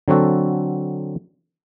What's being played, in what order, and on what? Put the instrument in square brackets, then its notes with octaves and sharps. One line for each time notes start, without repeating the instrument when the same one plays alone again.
[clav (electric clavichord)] D3 F#3 C4 F#4 A4